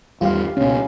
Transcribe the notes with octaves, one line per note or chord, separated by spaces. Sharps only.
G#1 E2 G3 F4 G4 F5
C#2 B2 C#4